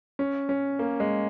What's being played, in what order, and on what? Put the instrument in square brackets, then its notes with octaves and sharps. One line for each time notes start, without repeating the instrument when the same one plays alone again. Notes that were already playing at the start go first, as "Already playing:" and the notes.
[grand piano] C#4
C#4
A#3
G#3